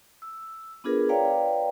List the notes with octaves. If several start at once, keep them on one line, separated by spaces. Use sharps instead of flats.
E6
B3 D4 F4 G#4 A#4 B4
B4 C#5 D5 F5 G5 A#5